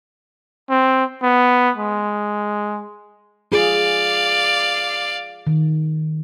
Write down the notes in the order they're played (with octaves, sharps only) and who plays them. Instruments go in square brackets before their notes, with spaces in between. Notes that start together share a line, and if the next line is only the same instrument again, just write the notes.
[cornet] C4
B3
G#3
[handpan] F4 G#4 [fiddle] D5 F5
[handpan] D#3